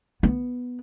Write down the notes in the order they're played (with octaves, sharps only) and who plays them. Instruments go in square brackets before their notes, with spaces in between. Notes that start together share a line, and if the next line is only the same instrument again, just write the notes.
[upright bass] B3